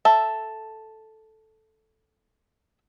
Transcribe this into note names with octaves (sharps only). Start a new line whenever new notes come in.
A4 E5